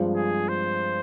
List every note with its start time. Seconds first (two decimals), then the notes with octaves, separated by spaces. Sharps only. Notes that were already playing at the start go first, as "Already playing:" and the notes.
Already playing: G2 F3 G#3 C4
0.16 G#4
0.49 C5